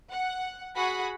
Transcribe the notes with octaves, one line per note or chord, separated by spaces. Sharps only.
F#5
F#4 G#4 F#5 B5